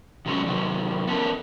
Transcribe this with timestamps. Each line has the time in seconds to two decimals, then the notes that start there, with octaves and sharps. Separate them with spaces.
0.26 C3 F#3 G#3 A3 C#4 A4
0.47 C3 D#3 F#3
1.07 B3 C#4 A4 A#4